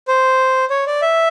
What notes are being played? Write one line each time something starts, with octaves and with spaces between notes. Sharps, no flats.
C5
C#5
D5
E5